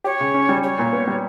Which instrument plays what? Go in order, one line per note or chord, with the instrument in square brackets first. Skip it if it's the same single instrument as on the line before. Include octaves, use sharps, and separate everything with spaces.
[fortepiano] G4 [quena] C#5
[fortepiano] C#3
C#4
G3
[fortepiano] G4 [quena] C#5
[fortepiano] A#2
B3
G3